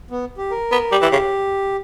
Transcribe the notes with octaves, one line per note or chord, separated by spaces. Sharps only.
B3
G4
A#4
B3
G3 G4
E3
C#3